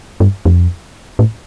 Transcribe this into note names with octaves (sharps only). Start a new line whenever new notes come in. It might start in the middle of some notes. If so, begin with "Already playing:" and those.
G2
F2
A2